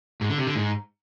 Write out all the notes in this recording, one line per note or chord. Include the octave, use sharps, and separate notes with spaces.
G#2
D3
C3
D3
G#2